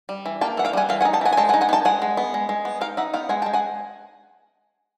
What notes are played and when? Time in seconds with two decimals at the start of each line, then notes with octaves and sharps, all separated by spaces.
0.09 G3
0.26 E3
0.41 A#3 G5 A5
0.57 E3 F#5
0.65 F5 G5
0.73 G3 F#5 G#5
0.89 E3 F5 G5
1.01 F#5 G#5
1.05 D#4
1.13 G5 A5
1.21 E3 F#5 G#5
1.33 G#5
1.37 G#3 G5 A5
1.49 F#5 G#5
1.54 D#4
1.61 F#5 G#5
1.69 B3
1.73 G5 A5
1.85 G#3 F#5 G#5
2.02 G#3
2.17 B3
2.34 G#3
2.49 G#3
2.65 B3
2.81 D#4 F5 G5
2.97 D#4 E5 F#5
3.14 B3 F5 G5
3.29 G#3 F#5 G#5
3.42 G5 A5
3.46 G#3
3.54 F#5 G#5